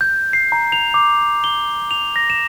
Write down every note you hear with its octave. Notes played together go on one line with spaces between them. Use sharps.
G6
C7
A#5
F7
D6
G7
F7
A#6
E7